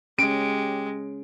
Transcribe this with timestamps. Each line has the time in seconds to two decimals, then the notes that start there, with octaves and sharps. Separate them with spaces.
0.19 G#3 C#4 G4 D7